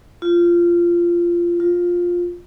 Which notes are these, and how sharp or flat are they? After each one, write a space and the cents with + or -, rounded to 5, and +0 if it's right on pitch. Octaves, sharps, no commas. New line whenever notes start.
F4 -15
F4 +10